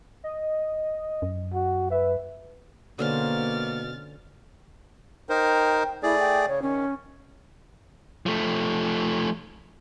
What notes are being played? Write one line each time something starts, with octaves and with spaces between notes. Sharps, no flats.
D#5
F#2
F#4
B4 E5
B2 D3 A#3 C#4 C5 F6 A6
D#4 A#4 C5 G5
A3 E4 G#4 D5
G5
C#3 C#5
D#3 C#4
F3 A3